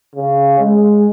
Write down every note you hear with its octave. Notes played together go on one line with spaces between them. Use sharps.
C#3
G#3